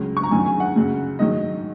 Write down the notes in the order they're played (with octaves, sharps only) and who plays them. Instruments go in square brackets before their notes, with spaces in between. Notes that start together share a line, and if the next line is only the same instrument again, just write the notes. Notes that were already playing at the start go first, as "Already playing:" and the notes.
Already playing: [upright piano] C#2 C#3 F#3
C#6
A#5
F#2 D#3 F#3 G#5
G#5
F#5
F#2 C#3 F#3
G#2 D#3 F#3 D#5